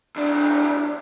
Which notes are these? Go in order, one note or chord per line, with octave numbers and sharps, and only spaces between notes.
E2 D4